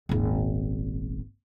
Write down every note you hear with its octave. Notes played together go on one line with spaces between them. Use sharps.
D#1 G#1